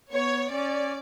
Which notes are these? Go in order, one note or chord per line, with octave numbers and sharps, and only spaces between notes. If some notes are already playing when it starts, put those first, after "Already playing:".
B3 C#5
C#4 D5